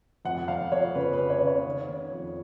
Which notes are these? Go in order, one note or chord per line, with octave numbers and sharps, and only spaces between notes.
F2 F#5
F2 F5
F2 C#5
C#3 B4
B4
C#3
C#5
C#3
C#5
D#3
D#3
F2